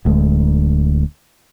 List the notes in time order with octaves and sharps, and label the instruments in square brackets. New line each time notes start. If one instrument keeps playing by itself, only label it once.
[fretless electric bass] D1 D2 G#3